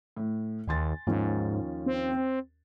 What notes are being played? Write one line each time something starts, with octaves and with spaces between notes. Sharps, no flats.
A2
D#2 G#5 C6 A6
D#2 G#2 F3 C#4
C4